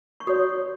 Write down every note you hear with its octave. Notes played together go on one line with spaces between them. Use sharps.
C#6
F#4 C#5 D#6